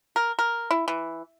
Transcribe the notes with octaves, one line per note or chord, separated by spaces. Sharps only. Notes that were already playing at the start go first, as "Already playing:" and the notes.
A#4
A#4
E4
E3